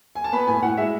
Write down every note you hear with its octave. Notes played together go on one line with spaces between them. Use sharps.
G#5
A5
B3 B5
A2 G#5
A2 F#5
G#3 E5